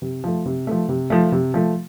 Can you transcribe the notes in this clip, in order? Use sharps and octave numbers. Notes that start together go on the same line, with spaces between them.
C3
F3 A3
C3
F3 A3
C3
F3 A3
C3
F3 A3